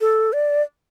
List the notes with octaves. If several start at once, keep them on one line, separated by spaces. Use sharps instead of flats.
A4
D5